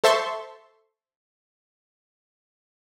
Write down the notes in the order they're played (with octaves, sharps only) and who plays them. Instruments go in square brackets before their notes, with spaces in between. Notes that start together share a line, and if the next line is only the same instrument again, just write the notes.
[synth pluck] A4 C5 E5 A5 C6 C#6